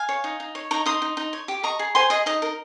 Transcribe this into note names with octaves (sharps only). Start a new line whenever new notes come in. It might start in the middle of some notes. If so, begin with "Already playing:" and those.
Already playing: F5 G#5
C#5
D#4
D#4
C#5
D#4 A#5 C#6
D#4 C6 D#6
D#4
D#4
C#5
G4
D#5 A#5 C#6
G#4
C5 G#5 C6
G#4 D#5
D#4 D#5
A#4